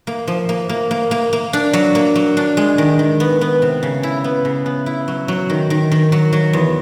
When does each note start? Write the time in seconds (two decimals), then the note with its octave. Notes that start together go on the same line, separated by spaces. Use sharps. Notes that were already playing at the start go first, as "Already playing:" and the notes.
0.07 A#3
0.27 F3
0.49 A#3
0.69 A#3
0.91 A#3
1.11 A#3
1.33 A#3
1.53 D4
1.73 F#3
1.95 A#3
2.15 F#3
2.37 D4
2.57 G#3
2.78 D#3
2.99 D#3
3.20 B3
3.41 B3
3.62 C3
3.83 C#3
4.03 E4
4.24 B3
4.45 C#3
4.66 B3
4.86 E4
5.08 F#3
5.28 F#3
5.50 D#3
5.70 D#3
5.92 D#3
6.12 F#3
6.33 F#3
6.53 E2